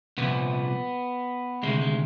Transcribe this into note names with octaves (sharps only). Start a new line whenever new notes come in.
C2 A#2 F3 B3
D2 C3 D#3 G#3
G#3